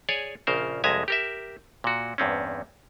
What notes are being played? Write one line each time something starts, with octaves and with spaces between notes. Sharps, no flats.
G#4 C#5 D5 G#5
A#1 C#3 A#4 C5
C2 F2 G#3 E5 G#5 A#5
G4 A#4 E5
A#2 F#4
E2 G2 C4 C#4